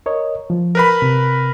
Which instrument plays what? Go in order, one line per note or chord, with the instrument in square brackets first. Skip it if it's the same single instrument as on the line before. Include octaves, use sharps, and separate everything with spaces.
[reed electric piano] A#4 C#5 D#5
F3
[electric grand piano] A#4 B4 B5
[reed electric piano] C3